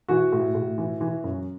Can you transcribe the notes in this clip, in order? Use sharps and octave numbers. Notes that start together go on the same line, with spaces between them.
E3 F#4
A2
A2
E3
E3
F#2